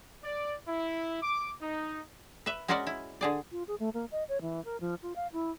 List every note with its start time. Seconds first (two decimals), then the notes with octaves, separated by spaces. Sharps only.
0.24 D5
0.68 E4
1.22 D6
1.61 D#4
2.46 B4 E5
2.68 G#3 C#4 F#4 A#4 D5 F#5
2.87 E4
3.21 D3 G#4 D5
3.52 F4
3.68 G#4
3.80 A3
3.94 A#3
4.12 D#5
4.29 C#5
4.42 E3
4.65 A#4
4.80 F3
5.03 F4
5.16 F5
5.33 E4